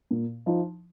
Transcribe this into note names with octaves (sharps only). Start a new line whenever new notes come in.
A#2
F3 D#4